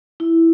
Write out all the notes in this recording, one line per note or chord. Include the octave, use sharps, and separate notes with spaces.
E4